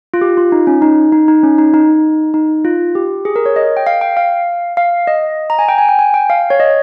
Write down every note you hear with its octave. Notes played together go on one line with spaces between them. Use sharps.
F4
G4
F4
D#4
C#4
D#4
D#4
D#4
C#4
D#4
D#4
D#4
F4
G4
G#4
A#4
C#5
D#5
G5
F5
G5
F5
F5
D#5
A#5
G#5
G5
G#5
G5
G#5
G5
F5
C#5
D#5